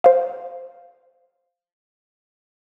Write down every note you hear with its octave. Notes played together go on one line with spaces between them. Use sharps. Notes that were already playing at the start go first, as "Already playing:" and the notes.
C5 F5